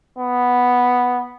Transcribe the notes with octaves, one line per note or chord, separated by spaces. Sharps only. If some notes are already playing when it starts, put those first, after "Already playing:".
B3